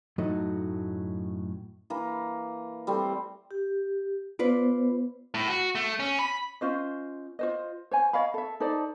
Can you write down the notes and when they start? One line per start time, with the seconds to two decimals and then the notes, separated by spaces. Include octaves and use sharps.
0.18 F#2 A2 F#3 A3 D#4
1.90 E3 A#3
2.87 G3 A3 C4
3.51 G4
4.39 B3 F4 B4 C5 D5
5.34 A2
5.48 F#4
5.75 A3
6.00 C#4
6.19 B5
6.61 C#4 F4 C5 D#5
7.39 F4 C5 D#5
7.91 C5 C#5 G#5
8.13 C#5 D#5 F5 B5
8.34 A4 E5
8.60 D#4 A4 C5 D5